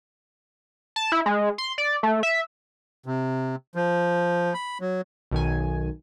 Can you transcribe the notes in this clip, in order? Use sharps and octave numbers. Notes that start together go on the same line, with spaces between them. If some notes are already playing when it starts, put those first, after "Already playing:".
A5
E4
G#3
C6
D5
A3
E5
C3
F3
B5
F#3
B1 D#3 G#5